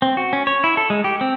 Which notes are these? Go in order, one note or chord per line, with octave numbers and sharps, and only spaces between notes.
C4
F#4
C#4
C#5
E4
A4
G#3
G4
C4